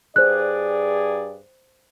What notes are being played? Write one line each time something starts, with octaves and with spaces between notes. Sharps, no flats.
G2 G#4 C5 D5 F#6